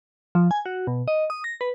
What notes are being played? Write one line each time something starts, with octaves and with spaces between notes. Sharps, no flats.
F3
G#5
F#4
B2
D#5
D#6
A#6
B4